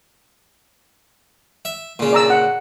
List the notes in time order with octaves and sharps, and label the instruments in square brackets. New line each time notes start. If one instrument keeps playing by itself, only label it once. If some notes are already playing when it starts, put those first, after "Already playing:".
[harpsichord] E5
A#2 C#3
[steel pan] D5 A#5 E6
F#5